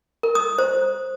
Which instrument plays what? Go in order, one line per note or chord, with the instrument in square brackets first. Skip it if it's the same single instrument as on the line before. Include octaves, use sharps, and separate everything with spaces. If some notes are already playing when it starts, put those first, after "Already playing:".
[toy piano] A#4
D#6
C5